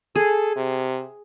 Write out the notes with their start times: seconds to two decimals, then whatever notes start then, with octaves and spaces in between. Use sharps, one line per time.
0.16 G#4 A4
0.56 C3